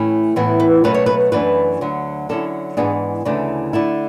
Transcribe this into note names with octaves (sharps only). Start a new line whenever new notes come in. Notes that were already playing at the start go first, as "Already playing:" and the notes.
Already playing: A2 E3 A3 C#4 E4
A2 E3 B3 E4
B4
B2 F#3 A3 C#4 B4
C#5
B4
F#2 E3 A3 D4 B4
D2 D3 F#3
D3 F#3 C#4 E4 A4
G#2 E3 B3 D4 G#4
D2 C#3 E3 A3 D4
D3 A3 E4